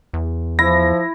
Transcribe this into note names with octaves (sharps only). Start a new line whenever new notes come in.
E2
F3 E4 A#6